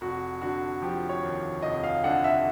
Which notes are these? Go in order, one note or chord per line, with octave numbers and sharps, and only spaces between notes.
F1 F#4
D3 F#4
F3 G4
C#5
D#2
F1 D#5
F5
D3 F#5
E5